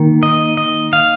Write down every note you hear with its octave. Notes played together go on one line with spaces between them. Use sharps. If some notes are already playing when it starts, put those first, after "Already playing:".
Already playing: D#3 A#3
D#5
D#5
F5